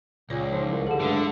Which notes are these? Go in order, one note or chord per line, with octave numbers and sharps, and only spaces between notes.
C#2 A#2 C#5
F3 D#4
C2
D3 G4 G#4
G2 D3 F#3 G#3 A3